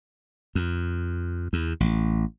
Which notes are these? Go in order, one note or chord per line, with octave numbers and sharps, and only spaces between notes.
F2
E2
A1